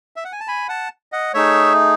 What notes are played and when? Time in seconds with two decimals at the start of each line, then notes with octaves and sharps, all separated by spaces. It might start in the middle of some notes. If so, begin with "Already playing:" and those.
0.16 E5
0.25 F#5
0.32 G#5
0.40 A5
0.48 G#5 B5
0.68 F#5 A5
1.12 D#5 F#5
1.34 A3 D#4 G#4 C#5 E5